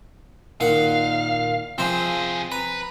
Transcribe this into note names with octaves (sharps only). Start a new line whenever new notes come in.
A#2 D#3 F5 F#5
C3 F3 C4 G#4 C5
B4 A#5